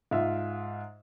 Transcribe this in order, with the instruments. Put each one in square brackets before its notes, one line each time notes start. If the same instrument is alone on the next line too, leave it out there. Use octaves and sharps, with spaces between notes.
[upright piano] G#2 F4 E5